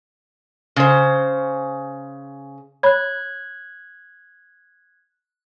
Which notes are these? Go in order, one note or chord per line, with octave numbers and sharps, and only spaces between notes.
C#3 C5
C#5 B5 F#6 G#6